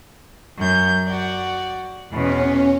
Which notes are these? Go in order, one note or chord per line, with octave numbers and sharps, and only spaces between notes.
F#2 G6
F#4 D5
E2 B2 C#4